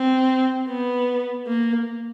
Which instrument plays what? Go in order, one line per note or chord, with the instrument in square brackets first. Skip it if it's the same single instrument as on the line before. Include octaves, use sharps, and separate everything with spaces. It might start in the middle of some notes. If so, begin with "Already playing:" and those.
Already playing: [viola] C4
B3
A#3